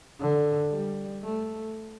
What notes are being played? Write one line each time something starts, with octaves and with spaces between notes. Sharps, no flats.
D3
G3
A3